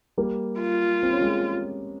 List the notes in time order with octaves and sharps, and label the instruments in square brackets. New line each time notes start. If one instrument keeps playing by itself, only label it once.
[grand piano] G3 A#3
[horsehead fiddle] F4
[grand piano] C4
C#4
G#3 C4